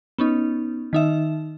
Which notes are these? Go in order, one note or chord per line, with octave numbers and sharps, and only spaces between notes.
B3 C#4 D#4
D#3 D#4 E5